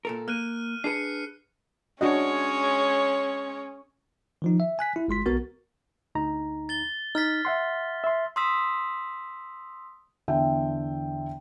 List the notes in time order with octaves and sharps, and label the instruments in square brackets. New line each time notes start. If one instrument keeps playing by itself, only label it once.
[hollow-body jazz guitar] A#2 A4 A#4
[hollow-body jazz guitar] A#3 [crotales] F6 F#6 D#7
[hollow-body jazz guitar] D4 G#4 B4 [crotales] C7 C#7
[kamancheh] G#3 C#5 [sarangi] C#4 [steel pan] D4 F#4 D#5
[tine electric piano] D#3 F3 D#4
E5
G#5 F#6 B6
E4
G1 G#3 C6 B6
B1 B3 F#4 A#4 A6
[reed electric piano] D2 D#4 A#5
[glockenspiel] A6 G7
[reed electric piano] D#4 [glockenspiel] F6 A6 B6
[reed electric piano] E5 F#5 C6
E5 C6
[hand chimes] C6 D#6 E6 B6
[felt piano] E2 D3 E5 G5